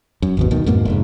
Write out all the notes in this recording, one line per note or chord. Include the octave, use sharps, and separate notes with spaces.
F#2
G#1 D#2 B2
D2 B2 D#3
F2 G#2 B2 A#3
F1 G#2